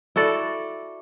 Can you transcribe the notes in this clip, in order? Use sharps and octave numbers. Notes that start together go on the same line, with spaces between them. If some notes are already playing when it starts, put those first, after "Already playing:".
E4 F#4 A4 D5